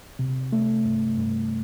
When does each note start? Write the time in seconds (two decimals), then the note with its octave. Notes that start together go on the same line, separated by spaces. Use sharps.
0.19 C3
0.53 A3
0.85 G2
1.18 G2